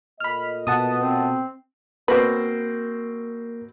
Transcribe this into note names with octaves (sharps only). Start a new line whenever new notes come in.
A#2 A3 D#5 B5 F6
B2 B3 F#5 A5 D#6
C4
B2 A#3 C4 A#4 B4 D5 A#6